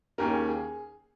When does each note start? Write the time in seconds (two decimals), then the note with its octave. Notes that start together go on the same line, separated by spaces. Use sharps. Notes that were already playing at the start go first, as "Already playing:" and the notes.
0.18 D#2 D#3 A#3 C#4 A#4
0.33 G#4
0.49 G#4